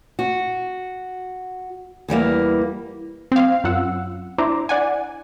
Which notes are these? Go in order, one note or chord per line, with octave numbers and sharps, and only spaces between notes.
F#4
E2 E3 G3 A#3
C4 F5
F#2 F4 F#5 E6
D4 E4 C5 A#5 D6
D5 F#5 G#5